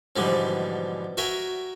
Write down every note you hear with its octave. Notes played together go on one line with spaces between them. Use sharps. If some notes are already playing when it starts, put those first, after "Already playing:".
G#2 B2 D3 E3 F3 G3
F#4 A#4 E5 G5 G#5